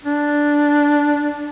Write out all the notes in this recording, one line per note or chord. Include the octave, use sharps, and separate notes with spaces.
D4